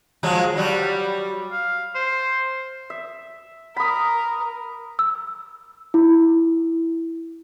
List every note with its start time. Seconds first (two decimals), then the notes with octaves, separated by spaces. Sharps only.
0.23 F3 F#3 G#3
0.56 F#3 G3 F#4
1.51 F5
1.95 C5
2.90 E5
3.76 A#4 B5 D#6
4.99 E6
5.94 E4